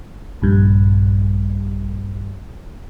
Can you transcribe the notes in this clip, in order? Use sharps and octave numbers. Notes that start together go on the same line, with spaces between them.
A#1 G2